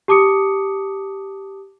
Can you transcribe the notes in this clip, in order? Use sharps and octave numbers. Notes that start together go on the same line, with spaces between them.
G4 A5 D6 D#6 C#7